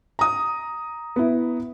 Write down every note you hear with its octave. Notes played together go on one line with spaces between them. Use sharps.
A#5 D#6
B3 E4